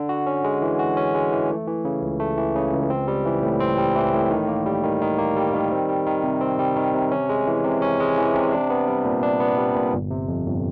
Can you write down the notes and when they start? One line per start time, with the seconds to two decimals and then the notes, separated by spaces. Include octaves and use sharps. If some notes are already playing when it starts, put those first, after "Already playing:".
Already playing: D3
0.09 F#4
0.27 C#4
0.44 G#3
0.62 E3
0.79 F#4
0.97 C#4
1.15 G#3
1.32 E3
1.50 A3
1.67 E3
1.85 C#3
2.02 C#2
2.20 A3
2.38 E3
2.55 C#3
2.73 C#2
2.90 C4
3.08 G3
3.26 E3
3.43 A2
3.60 C4
3.78 G3
3.95 E3
4.13 A2
4.31 D#3
4.48 A#3
4.66 G3
4.83 D#3
5.01 D#3
5.19 A#3
5.36 G3
5.53 D#3
5.71 C4
5.89 G3
6.06 D#3
6.24 C3
6.41 C4
6.59 G3
6.77 D#3
6.94 C3
7.12 C#4
7.29 G#3
7.47 E3
7.65 C3
7.82 C#4
8.00 G#3
8.17 E3
8.34 C3
8.53 D4
8.70 B3
8.88 G3
9.05 A#2
9.23 D4
9.40 B3
9.58 G3
9.75 A#2
9.93 G1
10.10 C3
10.28 F2
10.45 G1